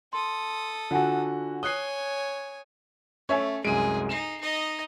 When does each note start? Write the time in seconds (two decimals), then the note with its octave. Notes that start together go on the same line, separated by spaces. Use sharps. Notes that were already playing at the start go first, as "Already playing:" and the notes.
0.13 A4 C6 D#6
0.91 D3 F4 F#4 F#5 G#5
1.63 C#5 G#5 D#6 F#6 C7 G7
3.29 A3 C#4 C#5 E5 G#5
3.65 C2 F#2 G#3 G#4 D7 D#7
4.09 D#4 C7 E7
4.40 D#4 D#5